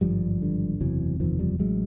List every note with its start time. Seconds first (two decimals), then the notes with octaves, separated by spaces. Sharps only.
0.01 G#1 G2 D3 F3 G3
0.42 G#1 G2 D3
0.80 F#1 E2 C3 E3 F#3
1.20 F#1 E2 C3 D#3 F3
1.39 F3 G3
1.60 A1 F#3 G#3